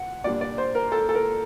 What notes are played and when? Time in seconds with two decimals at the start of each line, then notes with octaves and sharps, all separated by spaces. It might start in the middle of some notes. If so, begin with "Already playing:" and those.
Already playing: F#5
0.24 A#2 G3 D4 D5
0.41 D5
0.58 C5
0.75 A#4
0.92 A4
1.09 A4
1.15 A#4